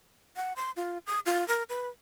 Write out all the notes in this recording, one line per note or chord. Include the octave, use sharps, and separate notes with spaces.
F#5
C6
F4
D#6
F4
A#4
B4